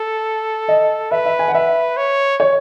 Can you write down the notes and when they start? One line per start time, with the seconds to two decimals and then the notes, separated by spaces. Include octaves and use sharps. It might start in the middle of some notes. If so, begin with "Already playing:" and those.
Already playing: A4
0.68 D#5
1.11 B4 E5
1.26 E5
1.39 G#5
1.48 F#5
1.54 B4 E5
1.97 C#5
2.40 C#5